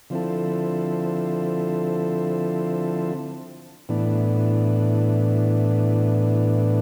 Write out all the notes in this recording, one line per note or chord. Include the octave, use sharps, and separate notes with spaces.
D3 F3 C4 E4 A4
A2 E3 B3 D4